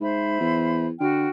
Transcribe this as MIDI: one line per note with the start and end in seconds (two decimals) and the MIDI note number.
0.01 0.38 44
0.01 0.86 72
0.01 0.86 76
0.01 0.86 83
0.40 0.91 40
1.00 1.28 50
1.00 1.28 66
1.00 1.28 79
1.00 1.28 89